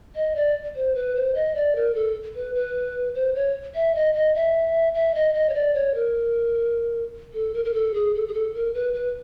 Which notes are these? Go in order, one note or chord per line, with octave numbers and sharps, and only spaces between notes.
D#5
D5
C5
B4
C5
D#5
D5
A#4
A4
B4
B4
C5
C#5
E5
D#5
D#5
E5
E5
D#5
D#5
C#5
D5
C#5
A#4
A4
A#4
A#4
A4
G#4
A4
G#4
A4
A#4
B4
B4